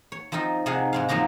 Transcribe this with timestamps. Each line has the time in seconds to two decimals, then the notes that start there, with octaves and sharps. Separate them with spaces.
0.12 C#5
0.32 F3 C4 D#4 F4
0.66 C3 D#4 G#4 F5 F#5
0.93 G#2 G#3 F5
1.09 F3 F#3 A#3 D#4 A#5